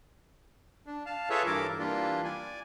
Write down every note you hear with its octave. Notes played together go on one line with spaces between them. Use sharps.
D4
F5 A5
F4 G#4 A4 B4 C#5 E5
G2 E3 A4 A#4 D6
E3 G3 A#3 D4 F4
D5 G#5